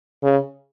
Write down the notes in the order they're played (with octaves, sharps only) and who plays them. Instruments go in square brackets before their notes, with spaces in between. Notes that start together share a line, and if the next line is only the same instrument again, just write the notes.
[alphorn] C#3